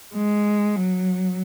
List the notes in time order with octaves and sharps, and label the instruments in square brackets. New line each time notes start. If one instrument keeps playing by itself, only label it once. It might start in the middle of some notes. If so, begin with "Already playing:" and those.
[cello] G#3
F#3